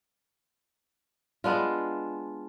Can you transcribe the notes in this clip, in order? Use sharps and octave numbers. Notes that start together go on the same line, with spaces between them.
G#3 B3 D4 F4